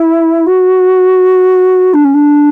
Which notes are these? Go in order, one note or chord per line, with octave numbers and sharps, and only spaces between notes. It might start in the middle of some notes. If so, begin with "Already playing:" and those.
Already playing: E4
F#4
D4
C#4
D4